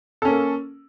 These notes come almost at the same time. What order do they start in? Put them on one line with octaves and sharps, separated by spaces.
A4 C#4 A#3